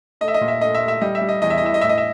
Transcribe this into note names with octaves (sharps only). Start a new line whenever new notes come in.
A3 D#5
E5
D#5
A#2
E5
A3 D#5
E5
A3
E5
G3 D#5
E5
G3
D#5
E2 D#5
E5
D#5
E3 E5
D#5
A2 E5
D#5
E5